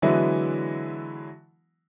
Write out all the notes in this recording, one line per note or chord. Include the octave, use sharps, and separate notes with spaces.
D3 E3 F#3 G#3 B3 E4